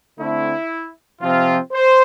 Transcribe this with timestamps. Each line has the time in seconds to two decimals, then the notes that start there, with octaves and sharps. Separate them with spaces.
0.18 D3 A3 C4 E4
1.21 C3 F3 C4 F4
1.73 C5